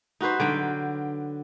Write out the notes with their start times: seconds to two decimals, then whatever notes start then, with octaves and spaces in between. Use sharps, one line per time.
0.21 D#4 F#4 B4 C5
0.40 D3 F#3 G5